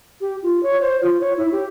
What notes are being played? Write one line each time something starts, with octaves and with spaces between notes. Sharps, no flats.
G4
F4
C#5
C5
F4
C#5
E4
G4